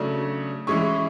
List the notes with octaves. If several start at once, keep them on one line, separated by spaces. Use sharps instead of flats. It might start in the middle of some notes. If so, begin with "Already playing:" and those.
Already playing: C#3 F#3 A3 D4
E3 G#3 C#4 E4 C#6